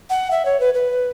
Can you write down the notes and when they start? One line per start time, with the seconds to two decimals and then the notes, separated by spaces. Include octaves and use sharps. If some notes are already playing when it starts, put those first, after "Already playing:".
0.10 F#5
0.31 E5
0.45 C#5
0.60 B4
0.74 B4